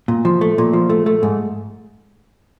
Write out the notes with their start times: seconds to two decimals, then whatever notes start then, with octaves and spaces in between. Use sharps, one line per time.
0.08 A#2
0.25 F3
0.41 A3
0.58 A#2
0.73 F3
0.90 A3
1.06 A3
1.23 G#2